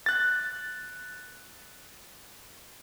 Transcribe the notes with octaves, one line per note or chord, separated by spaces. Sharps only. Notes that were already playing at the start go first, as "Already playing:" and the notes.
F#6 A6